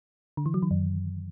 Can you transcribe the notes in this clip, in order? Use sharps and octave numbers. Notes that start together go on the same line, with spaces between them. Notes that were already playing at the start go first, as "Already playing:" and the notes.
D3
E3
F#3
D#3
F#2